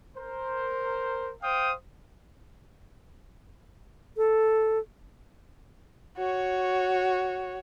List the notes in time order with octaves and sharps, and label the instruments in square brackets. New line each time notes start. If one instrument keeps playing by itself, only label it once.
[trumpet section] A#4 C5
C5 F5 G5 D#6
[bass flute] A4
[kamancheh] F#4 C#5